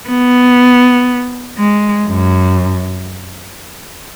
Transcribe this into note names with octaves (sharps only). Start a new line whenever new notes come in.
B3
G#3
F#2